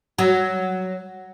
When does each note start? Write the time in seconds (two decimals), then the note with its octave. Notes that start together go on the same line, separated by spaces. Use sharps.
0.18 F#3